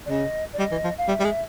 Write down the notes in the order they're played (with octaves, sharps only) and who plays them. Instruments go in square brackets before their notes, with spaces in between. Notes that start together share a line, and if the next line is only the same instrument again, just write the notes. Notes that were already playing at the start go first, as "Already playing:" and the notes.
[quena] D5
[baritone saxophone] C#3 [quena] D#5
[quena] D5
[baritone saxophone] G3 [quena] D#5
[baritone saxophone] E3
F3
[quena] F5
[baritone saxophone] G3 [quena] E5
[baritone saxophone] G3
G#3